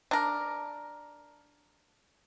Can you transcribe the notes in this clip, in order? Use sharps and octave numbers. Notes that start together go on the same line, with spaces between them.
D4 A#4